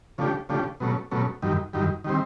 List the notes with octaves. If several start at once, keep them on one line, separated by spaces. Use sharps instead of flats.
C#3 F3 A3 D4 G4
C#3 F3 A3 D4 G4
B2 F#3 A3 C#4
B2 F#3 A3 C#4
F#2 D#3 G3
F#2 D#3 G3
D#3 G3 C4